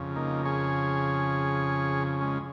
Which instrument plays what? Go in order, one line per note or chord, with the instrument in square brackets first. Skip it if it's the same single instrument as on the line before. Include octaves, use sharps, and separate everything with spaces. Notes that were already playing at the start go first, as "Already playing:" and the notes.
Already playing: [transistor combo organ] F2 C#3
A#3 D#4
G#4 C#5
G#3 C#4